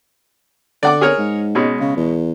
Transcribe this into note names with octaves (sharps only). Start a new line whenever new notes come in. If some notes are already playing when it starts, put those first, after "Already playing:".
D3 D5 F#5 D6
G#4 A#4 C#5
G#2
B2 G#3 C#4
C#3
E2